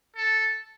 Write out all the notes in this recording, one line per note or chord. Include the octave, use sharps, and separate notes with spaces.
A4